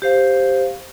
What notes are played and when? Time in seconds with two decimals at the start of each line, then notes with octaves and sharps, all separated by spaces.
0.02 G4 C5 F5